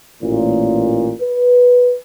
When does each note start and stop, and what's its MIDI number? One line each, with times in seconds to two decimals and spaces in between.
0.22 1.13 33
0.22 1.13 46
1.21 1.96 71